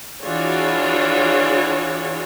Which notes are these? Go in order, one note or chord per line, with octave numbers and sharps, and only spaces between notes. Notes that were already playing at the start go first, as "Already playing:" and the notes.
E3 D4 F4 F#4 G#4 C#5